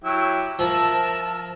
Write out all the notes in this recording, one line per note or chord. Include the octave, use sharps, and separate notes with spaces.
F#3 E4 G4
F3 A#4 E5 A5